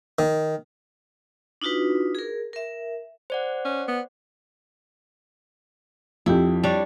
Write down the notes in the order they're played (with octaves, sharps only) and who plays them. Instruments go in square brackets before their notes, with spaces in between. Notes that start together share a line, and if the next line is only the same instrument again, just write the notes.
[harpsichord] D#3
[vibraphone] D4 D#4 F4 F#4 B4
G#4 A#4
A#4 E5
[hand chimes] C5 D5 F#5
[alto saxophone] C#4
B3
[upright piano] F2 G4 [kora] E4
[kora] G3 D4 C#5